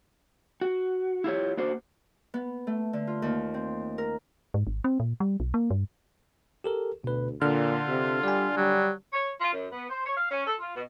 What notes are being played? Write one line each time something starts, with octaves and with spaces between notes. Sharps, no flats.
F#4
E4 F4 G4 C#5
A#3 D4 F#4 C5
B3
A3
D3
F4
D#2
C4
A#4
G#2
G#1
C4
A#2
G3
B1
A#3
G2
G4 A4 A#4
D2 B2 B4
A#2 D3 F4 F6
C3
G3 D5 G#5
F#3 G3
C#5
F4
F#2
B3
C5
C#5
F5
C#4
A4
F4
B2